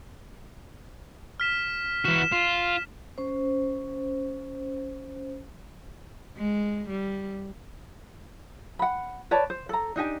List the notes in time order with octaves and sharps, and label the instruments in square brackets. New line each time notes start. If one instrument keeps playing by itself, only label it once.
[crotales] F6 B6 E7
[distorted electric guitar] E3 F#4 [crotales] E7
[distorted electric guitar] F4
[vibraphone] C#4 C5
[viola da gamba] G#3
G3
[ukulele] F#5 B5
B4 C#5 D5 A5
C5
A4 A#5
D4 D#4 G4 G#5